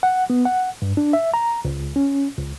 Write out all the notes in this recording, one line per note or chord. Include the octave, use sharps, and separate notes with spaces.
F#5
B3
F#5
G2
D4
E5
A#5
C#2
C#4
C#2